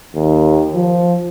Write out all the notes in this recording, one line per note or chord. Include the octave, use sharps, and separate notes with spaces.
D#2
F3